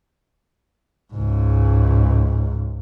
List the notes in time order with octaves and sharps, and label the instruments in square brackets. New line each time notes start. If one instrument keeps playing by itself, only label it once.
[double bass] C#2 G#2